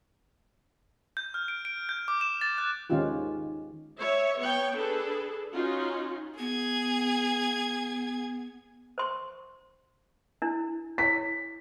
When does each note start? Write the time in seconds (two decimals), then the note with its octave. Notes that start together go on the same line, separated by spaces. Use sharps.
1.17 G6
1.34 F6
1.48 D7
1.65 D7
1.89 G6
2.08 D6
2.21 E7
2.41 A6
2.58 F#6
2.90 D#3 G#3 C#4 D#4 F4 G4
3.99 C#5 E5
4.39 B3 C#5 G5
4.77 D4 G#4 A4 B4
5.52 C#4 D#4 F4 F#4
6.39 B3 G#4 G#6
8.98 C5 C6 C#6
10.42 D4 E4
10.98 E4 C#5 B6